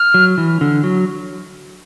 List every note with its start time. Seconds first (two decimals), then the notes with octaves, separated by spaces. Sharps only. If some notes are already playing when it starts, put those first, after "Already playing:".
Already playing: F6
0.14 F#3
0.38 E3
0.61 D3
0.84 F#3